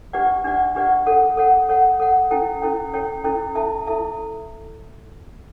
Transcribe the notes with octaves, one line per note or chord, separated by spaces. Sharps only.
D4 G4 B4 D5 F#5
D4 G4 B4 D5 F#5
D4 G4 B4 D5 F#5
A4 C#5 F#5
A4 C#5 F#5
A4 C#5 F#5
A4 C#5 F#5
C#4 E4 A4 C#5 G5
C#4 E4 A4 C#5 G5
C#4 E4 A4 C#5 G5
C#4 E4 A4 C#5 G5
E4 A4 E5 A5
E4 A4 E5 A5